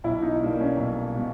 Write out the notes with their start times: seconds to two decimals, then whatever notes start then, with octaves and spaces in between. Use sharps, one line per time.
0.04 B1 E4
0.22 D#4
0.41 B2 G3 A#3 D4
0.60 C#4
0.78 B1
1.15 B2 G3 A#3